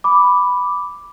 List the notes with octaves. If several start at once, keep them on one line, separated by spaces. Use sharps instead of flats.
B5 D6